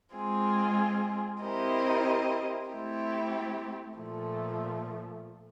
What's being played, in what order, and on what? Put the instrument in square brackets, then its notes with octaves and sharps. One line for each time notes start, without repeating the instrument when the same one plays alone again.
[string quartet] G#3 C4 F4 G#4
C4 E4 G4 A#4 D#5
A3 C4 E4 G4
A#2 F3 A3